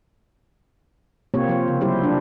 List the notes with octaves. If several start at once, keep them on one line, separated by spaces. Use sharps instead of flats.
C3 A#3 C4 F4 G4 C#5
F3 F4 C5
C#3
F#3 G3 E4 G4 C5
D4